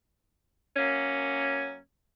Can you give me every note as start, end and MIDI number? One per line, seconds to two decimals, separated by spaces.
0.76 1.79 42
0.76 1.79 58
0.76 1.79 61